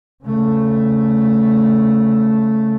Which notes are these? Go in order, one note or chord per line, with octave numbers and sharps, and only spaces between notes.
C#3 A3